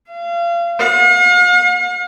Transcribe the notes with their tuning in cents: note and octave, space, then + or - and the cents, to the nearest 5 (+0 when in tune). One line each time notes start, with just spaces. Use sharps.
F5 -30
F5 +45